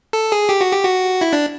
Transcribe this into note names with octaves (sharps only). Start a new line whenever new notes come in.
A4
G#4
G4
F#4
G4
F#4
E4
D4